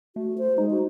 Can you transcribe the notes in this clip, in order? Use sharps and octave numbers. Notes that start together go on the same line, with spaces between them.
A3 F#4
C5
G#3 D#4
F#4